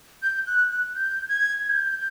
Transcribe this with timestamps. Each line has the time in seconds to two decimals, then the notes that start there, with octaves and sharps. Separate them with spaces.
0.23 G6
0.47 F#6
0.71 F#6
0.95 G6
1.29 G#6
1.65 G#6
1.70 G6